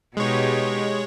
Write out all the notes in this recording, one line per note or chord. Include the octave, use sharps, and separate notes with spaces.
B2 G#3 D#4 G4 C#5